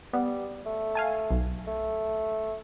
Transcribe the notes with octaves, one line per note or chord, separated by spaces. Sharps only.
G3 B3
A3
F5 G#5 A5
B1
A3